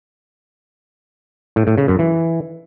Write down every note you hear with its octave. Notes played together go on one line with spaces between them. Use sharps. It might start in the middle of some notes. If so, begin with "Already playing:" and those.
A2
A2
C#3
F#2
E3